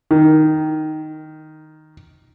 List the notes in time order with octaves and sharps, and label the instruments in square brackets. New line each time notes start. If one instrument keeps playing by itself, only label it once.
[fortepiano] D#3